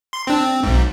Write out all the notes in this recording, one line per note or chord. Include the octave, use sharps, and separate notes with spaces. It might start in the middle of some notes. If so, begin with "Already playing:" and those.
C6
C4 D4
C4
B1 G#2